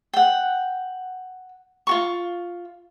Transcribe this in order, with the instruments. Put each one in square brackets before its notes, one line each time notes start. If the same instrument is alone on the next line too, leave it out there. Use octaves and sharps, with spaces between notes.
[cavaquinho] F#5 G5
F4 F#4 C#6